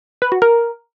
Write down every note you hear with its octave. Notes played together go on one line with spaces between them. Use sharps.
B4
F#4
A#4